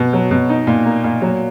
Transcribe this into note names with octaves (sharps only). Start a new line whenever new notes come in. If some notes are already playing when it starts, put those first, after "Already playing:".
Already playing: B2 B3
F#3
B2
D#4
A#2
A#3
A#2
F#3